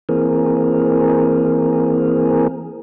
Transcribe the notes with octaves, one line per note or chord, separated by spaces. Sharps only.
E3 A#3 C4 G#4 A#4